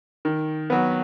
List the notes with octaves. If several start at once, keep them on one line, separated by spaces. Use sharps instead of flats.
D#3
F#3 B3